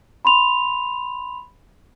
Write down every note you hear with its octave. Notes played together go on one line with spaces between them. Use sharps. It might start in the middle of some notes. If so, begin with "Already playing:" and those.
B5 C6 F7